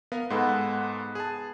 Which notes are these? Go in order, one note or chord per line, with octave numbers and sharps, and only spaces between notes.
B3 A#4 F5
G#2 G#3 B3 A4 B4
G#4 A5